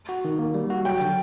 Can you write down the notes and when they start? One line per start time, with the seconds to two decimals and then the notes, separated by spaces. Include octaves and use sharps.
0.09 F#4
0.25 D#3
0.39 A#3
0.54 G3
0.70 F#4
0.85 F#3 G5
1.01 D3